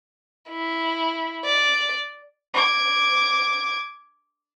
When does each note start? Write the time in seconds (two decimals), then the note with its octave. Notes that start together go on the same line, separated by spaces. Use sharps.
0.50 E4
1.45 D5
2.54 D6 G#6